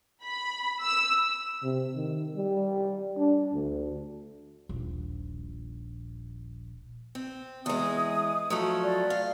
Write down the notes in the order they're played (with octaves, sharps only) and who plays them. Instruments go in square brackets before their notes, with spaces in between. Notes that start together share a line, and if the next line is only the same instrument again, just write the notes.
[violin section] B5
E6
[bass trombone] C3
D#3
G3
D4
D2
[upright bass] D#1 A#1
[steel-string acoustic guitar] C4
[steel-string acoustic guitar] E2 G#3 [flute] D#6
[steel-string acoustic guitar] F3 F#3 A3
[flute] D5
[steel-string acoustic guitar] F5